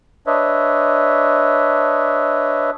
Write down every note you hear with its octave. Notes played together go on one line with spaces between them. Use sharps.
D4 B4 C#5 D#5 E5